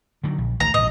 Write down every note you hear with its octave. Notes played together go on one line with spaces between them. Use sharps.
D3 D#3 F#3
A#1
G#1 D2 A#5
A#1 G#2 D#5